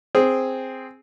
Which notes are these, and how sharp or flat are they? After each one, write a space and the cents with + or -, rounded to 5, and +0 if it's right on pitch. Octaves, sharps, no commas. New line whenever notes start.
C4 +0 G#4 +0